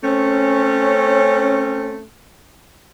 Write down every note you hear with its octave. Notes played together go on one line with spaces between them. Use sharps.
A3 C4 C#4